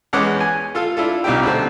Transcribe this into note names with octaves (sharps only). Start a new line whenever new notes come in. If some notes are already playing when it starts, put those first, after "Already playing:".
E2 G#3 B3 C#4 F#5 D6
G#5
F4 A4 F5
D4 E4 F4 A4
C2 A#2 G3 D#4 G4 G5
B2 D3 A3 C4